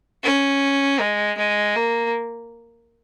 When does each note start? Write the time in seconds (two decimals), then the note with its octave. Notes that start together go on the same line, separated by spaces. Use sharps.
0.24 C#4
1.00 G#3
1.38 G#3
1.75 A#3